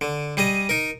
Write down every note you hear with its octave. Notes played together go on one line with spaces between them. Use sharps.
D3
G3 G#4 D#5 D#6
D#4 A#4